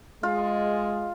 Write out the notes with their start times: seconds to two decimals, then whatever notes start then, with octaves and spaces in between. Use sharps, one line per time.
0.23 G#3 F4